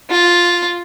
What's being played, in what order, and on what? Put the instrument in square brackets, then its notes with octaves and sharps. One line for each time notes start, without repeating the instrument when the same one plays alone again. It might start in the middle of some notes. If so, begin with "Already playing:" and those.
[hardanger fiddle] F4